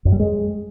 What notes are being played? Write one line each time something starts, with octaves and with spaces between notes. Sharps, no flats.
F#2
G3
G#3